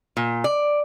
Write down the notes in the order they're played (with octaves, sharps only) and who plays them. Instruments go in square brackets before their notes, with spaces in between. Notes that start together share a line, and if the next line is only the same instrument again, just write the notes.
[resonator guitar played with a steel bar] A#2
D5